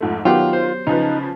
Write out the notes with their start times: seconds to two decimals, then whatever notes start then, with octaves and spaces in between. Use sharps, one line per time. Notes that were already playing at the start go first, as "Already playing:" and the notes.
0.01 F2 G#2 A3
0.25 D#3 F#3 B3 F4 G4 F#5 G5
0.53 C5
0.87 C#3 F3 D#4 B4